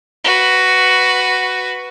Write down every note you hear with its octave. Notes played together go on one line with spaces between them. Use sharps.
F#4 B4